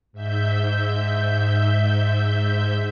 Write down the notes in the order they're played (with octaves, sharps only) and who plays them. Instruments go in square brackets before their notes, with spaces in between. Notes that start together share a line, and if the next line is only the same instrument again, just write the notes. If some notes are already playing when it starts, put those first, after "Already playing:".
[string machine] G#2 E5 G6